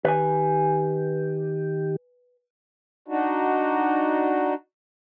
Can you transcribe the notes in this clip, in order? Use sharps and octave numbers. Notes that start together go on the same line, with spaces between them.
D#3 G4 B4 G#5
D4 D#4 F#4